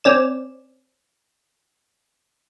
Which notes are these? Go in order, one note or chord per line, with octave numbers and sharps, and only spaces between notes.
C4 C#4 D5 E7